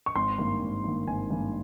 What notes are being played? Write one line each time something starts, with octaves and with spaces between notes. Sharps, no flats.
C#6
G#1 C6
G2 D#3 A#3
G#1
G2 D#3 A#3
G#1 G#5
G2 D#3 A#3